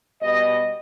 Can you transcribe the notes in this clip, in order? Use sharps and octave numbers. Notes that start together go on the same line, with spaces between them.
B2 G3 D#5